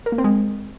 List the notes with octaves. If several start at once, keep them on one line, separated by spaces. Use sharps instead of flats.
A#4
A#3
C4
G#3